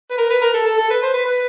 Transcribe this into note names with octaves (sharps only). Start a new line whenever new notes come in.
B4
A#4
B4
A#4
A4
A4
A4
B4
C5
B4
B4